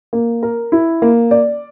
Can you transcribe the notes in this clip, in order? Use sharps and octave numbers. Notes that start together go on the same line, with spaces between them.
A#3
A#4
E4
A#3
D5